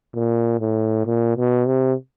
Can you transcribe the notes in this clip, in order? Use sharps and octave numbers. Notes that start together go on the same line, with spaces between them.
A#2
A2
A#2
B2
C3